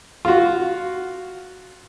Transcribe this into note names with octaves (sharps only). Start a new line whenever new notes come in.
F4 F#4